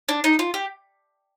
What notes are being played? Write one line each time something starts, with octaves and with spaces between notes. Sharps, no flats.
D4
D#4
F4
G4